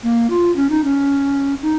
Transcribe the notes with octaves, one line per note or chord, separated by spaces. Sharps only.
A#3
F4
C#4
D#4
C#4
D#4